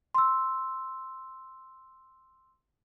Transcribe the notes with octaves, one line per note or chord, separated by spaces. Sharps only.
C6 E6